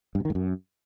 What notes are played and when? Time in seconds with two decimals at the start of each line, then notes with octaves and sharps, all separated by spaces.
0.15 G2
0.20 B2
0.25 D#3
0.30 G#2
0.35 F#2